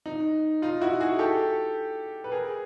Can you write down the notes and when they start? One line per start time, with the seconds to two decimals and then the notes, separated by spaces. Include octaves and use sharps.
0.06 D#4
0.62 D#4 F4
0.81 E4 F#4
1.00 F#4 G#4
1.19 G4 A4
2.24 B4
2.32 G#4 A#4